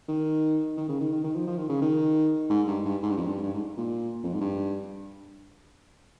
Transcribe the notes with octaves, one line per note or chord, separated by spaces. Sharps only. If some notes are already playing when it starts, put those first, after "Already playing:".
D#3
D#3
C#3
D#3
D#3
D#3
F3
F3
D#3
C#3
D#3
G#2
G2
G2
G#2
G2
F2
G2
G2
G#2
A#2
F2
G#2
G2